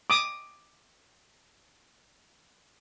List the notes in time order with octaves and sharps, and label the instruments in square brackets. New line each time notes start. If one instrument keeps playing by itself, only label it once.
[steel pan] D6 D#6